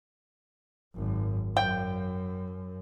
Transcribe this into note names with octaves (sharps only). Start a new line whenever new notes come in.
G#1 F#2
F#2 G5